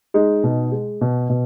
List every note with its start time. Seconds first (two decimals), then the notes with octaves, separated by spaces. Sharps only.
0.14 G#3 D#4
0.44 B2
0.72 G#3
1.01 B2
1.30 B2